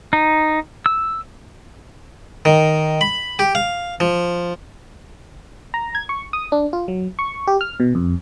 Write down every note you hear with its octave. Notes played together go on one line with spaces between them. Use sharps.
D#4
E6
D#3
B5
G4
F5
F3
A#5
G#6
C#6
D#6
D4
F4
F#3
C#6
G4
F6
B2
F2